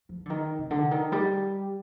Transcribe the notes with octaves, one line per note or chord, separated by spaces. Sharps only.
F3
D3
D#3
C3
D3
D#3
G3